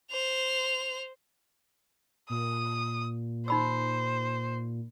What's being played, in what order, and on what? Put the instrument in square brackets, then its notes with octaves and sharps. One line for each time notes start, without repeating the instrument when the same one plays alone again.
[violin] C5 F7
[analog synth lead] A#2 [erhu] D#6
[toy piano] D#4 B5 E6 [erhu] C5